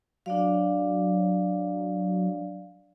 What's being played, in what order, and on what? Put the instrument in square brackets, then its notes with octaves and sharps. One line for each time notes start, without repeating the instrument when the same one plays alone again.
[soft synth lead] F#3 [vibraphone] D4 D5 F5